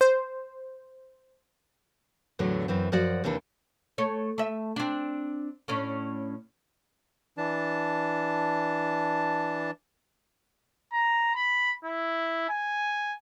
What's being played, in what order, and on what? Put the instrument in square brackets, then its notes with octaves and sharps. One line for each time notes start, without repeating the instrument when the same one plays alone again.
[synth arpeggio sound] C5
[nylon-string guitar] E2 A2 D3 F#3
F#2 E3 C4
F#2 F3 F#4 D5 F#5
D#2 C3 E3 D4 A4
[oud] A3 C#5
A3 E5
C4 D4
A2 C#4 D4
[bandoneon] E3 D4 A5
[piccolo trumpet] A#5
B5
E4
G#5